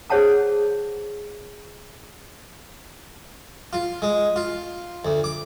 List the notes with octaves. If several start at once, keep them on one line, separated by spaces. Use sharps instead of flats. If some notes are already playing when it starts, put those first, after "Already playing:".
G#4 C5 C#5 F#5 A5 D#6
F4
G#3
F4
D2
D6